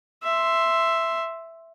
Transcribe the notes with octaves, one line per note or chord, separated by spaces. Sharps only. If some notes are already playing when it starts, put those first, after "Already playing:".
E5 C6